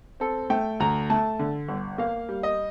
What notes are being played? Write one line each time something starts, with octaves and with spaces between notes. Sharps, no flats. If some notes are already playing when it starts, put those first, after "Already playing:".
C4 A4
A3 G5
D2 A#5
A3 A5
D3
G1
A#3 F5
G3
D#5